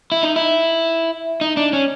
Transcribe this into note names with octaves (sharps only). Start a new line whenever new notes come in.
E4
D#4
E4
D#4
D4
C#4